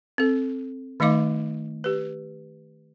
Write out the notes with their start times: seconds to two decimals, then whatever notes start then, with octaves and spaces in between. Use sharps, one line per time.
0.18 C4 A4
1.00 D#3 A3 D#4 D#5 F5 D6
1.84 G4 B4